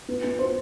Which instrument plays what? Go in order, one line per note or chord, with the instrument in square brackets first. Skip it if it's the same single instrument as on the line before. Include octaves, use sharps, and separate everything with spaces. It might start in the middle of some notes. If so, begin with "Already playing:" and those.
[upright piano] B3
B3
C5